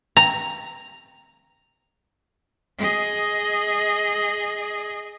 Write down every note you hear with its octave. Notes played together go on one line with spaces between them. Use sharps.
A#5
G#4 D#5